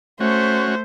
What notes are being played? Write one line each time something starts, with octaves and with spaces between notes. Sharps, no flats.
A3 C#4 F#4 C5